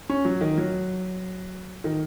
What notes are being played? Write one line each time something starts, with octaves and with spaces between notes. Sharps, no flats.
C#4
F#3
D#3
F#3
D#3